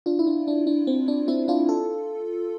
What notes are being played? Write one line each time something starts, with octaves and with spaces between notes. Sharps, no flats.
D4 F4
E4
D4
D4
D4
C4
D4
C4 E4
D4 F4
F4 A4